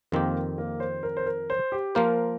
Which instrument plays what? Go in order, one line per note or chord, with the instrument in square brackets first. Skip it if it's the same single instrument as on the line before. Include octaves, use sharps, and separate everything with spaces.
[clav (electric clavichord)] F2 D#3 C4 G4 [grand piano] A#3
[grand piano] A#3
C5
A#4
C5
A#4
C5
G4
[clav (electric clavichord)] F3 A#3 F4 C5 [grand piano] A#4